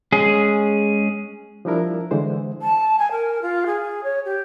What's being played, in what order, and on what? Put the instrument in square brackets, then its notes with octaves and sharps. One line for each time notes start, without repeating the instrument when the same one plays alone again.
[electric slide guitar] G#3 C#4 G#4
[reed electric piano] F3 G3 D4 E4 A#4
D3 E3 G#3 C5
[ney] A5
G#5
A#4
F4
G#4
C#5
G4